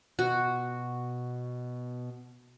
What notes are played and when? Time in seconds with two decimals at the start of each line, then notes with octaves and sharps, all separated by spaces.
0.19 B2 F#4